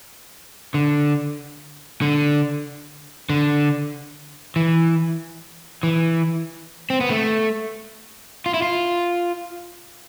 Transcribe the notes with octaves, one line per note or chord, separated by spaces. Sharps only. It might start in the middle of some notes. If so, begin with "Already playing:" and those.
D3
D3
D3
E3
E3
C4
B3
A3
F4
E4
F4